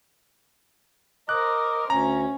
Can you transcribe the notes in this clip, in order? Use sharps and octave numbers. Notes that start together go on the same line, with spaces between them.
A#4 C5 D#5 D6 F#6
D2 C#4 A#5